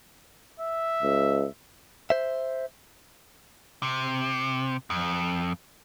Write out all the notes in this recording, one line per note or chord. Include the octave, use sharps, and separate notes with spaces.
E5
C#2
C5 E5
C3
F2